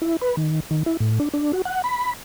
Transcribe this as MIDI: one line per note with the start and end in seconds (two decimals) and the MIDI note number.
0.02 0.17 64
0.21 0.36 71
0.37 0.60 51
0.71 0.83 51
0.86 0.97 64
1.00 1.19 45
1.20 1.29 62
1.34 1.52 62
1.53 1.62 66
1.65 1.82 78
1.84 2.13 83